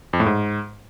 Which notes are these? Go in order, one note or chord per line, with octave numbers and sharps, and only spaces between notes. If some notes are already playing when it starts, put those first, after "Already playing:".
F2
A2
G#2